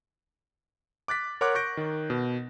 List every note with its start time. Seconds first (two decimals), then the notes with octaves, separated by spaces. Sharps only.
1.08 D6 F#6 A6 B6
1.41 A#4 C#5 F#5 C6 D6 F#6
1.55 C#6 F#6 G6 A#6 D7
1.77 D#3
2.10 B2